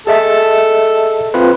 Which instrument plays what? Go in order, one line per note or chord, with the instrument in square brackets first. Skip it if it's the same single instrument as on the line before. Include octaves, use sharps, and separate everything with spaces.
[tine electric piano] G#4 D#5 E5 [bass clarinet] A4
[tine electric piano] C4 F4 B4